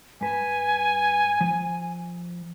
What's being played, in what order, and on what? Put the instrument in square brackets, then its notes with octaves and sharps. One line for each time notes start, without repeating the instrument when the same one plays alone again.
[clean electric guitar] G2 B4 A5 [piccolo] G#5
[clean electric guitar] F3